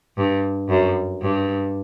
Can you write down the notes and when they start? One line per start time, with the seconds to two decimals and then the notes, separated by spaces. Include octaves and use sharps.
0.17 G2
0.69 F#2
1.22 G2